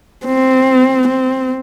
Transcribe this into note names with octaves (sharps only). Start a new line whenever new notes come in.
C4
C4